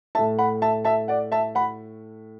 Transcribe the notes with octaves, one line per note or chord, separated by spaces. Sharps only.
A2 A3 E5 A5
F#5 B5
E5 A5
E5 A5
D5 F#5
E5 A5
F#5 B5